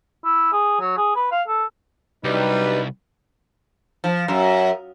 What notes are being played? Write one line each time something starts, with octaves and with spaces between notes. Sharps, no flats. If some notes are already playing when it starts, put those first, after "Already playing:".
E4
G#4
F#3
G#4
B4
F5
A4
C2 F#3 G3 D4 D#4 B4
F3
F#2